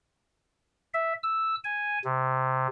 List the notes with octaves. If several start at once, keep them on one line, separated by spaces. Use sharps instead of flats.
E5
E6
G#5
C3